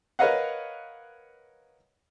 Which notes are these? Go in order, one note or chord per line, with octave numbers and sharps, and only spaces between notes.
A#4 B4 C#5 D#5 F5 F#5